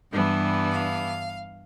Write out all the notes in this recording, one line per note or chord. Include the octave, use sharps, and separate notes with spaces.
G2 E3 G3 B3 D4
F5